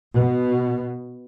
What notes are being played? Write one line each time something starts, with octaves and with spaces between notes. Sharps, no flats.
B2